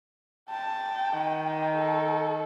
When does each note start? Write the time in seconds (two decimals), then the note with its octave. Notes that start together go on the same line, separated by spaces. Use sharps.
0.50 G5 A5
1.14 D#3
1.76 A4